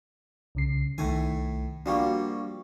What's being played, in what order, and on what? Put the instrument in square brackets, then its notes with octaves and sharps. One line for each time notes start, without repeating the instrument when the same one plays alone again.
[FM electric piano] C2 C#3 C7
[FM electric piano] C2 D#3 [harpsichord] A2 A3 G#5
[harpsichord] F3 G3 A#3 [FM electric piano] D4 F#4 C#6